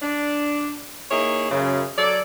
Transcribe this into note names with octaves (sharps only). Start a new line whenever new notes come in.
D4
A#3 D#4 E4 G#4 C#5
F#2 C#3
F#3 A4 D5